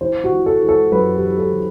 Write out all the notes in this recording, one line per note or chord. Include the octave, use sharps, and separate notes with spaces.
E3 C5
F#4
E3
A4
E3
A4
F#2 B4
G4
E3
A4
E3